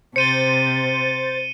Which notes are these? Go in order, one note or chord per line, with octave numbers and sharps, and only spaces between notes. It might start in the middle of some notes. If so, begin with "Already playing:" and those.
C3 C5 A6 C#7 D#7 G7